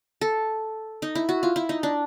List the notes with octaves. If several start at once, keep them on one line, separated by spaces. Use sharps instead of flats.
A4
D#4
E4
F#4
F4
E4
D#4
D4